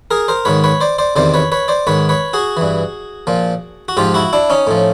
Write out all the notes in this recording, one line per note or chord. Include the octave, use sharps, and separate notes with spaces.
G#4 A#4
A#4 C5
G#2 D#3 B4 C#5
B4 C#5
C5 D5
C5 D5
E2 C3 D#3 C5 D5
B4 C#5
B4 C#5
C5 D5
G#2 D#3 B4 C#5
B4 C#5
F#4 G#4
G2 E3
A#2 F3
F#4
G#2 F3 F4 G4
E4 F#4
D4 E4
C#4 D#4
A2 F3